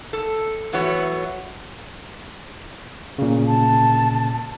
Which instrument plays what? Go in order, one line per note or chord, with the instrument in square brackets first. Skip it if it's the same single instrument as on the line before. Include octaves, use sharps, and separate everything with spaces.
[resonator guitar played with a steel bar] A4
E3 F#3 A3 B3 F#4 C#5
[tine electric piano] A#2 C#3
[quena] A5